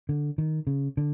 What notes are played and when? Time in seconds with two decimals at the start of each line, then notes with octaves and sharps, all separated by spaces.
0.09 D3
0.38 D#3
0.67 C#3
0.97 D3